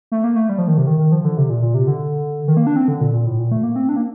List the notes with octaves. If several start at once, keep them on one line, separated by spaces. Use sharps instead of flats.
A3
A#3
A3
G3
F3
D#3
C3
D#3
D#3
F3
D3
C3
A#2
A#2
C3
D3
D#3
A#3
D4
C4
D3
A#2
A#2
A2
A#2
A3
A#3
C4
D4
A#3